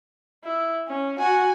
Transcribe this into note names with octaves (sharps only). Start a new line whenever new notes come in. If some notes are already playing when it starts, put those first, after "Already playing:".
E4
C#4
F#4 G#5